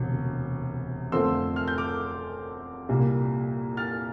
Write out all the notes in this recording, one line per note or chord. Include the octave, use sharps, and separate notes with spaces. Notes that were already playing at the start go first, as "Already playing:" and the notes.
Already playing: E1 D2 C3
F2 D3 F3 A3 C4 C6 E6
F6
G6
D6 F6
C2 A#2 G3 A#3
F6 A6